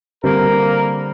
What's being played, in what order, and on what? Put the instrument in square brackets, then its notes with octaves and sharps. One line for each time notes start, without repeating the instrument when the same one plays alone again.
[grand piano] D3 G3 C4 [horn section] A#3 A#4